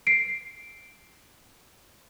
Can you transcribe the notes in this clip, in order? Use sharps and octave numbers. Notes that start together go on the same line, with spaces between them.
C7 D7